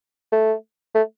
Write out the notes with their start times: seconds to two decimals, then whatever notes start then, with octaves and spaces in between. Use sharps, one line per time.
0.32 A3
0.95 A3